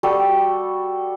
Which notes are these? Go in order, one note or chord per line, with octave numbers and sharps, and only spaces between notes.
G3 F#4 A4 G5